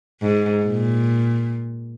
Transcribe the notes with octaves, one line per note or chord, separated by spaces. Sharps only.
G#2
A#2